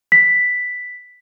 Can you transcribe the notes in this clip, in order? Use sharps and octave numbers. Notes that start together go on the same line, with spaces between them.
B6